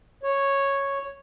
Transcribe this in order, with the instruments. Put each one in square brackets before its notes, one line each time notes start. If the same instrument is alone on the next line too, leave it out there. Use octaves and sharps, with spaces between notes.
[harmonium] C#5